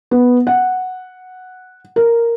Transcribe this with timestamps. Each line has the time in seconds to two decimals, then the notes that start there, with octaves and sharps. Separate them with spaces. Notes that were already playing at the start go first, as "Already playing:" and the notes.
0.11 B3
0.47 F#5
1.96 A#4